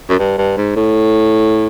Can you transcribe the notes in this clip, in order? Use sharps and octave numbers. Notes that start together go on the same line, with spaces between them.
F#2
G2
G2
G#2
A2